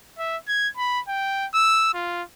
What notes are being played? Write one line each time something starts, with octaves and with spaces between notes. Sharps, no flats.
E5
G#6
B5
G5
E6
F4